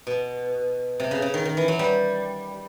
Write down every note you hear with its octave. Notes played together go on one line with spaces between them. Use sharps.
B2
C3
C#3
C#3
D#3
D#3
E3
F#3
G3